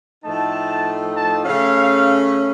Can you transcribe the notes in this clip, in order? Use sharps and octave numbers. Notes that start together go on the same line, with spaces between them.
A2 F3 A3 D#4 A5
A5
C#3 A3 C#4 F5